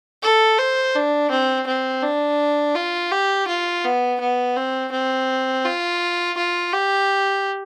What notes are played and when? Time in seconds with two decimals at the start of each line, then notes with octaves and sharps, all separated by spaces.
0.23 A4
0.58 C5
0.95 D4
1.31 C4
1.67 C4
2.03 D4
2.75 F4
3.11 G4
3.48 F4
3.84 B3
4.20 B3
4.56 C4
4.92 C4
5.64 F4
6.37 F4
6.73 G4